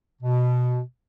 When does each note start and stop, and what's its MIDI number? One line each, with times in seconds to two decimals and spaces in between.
0.22 0.79 47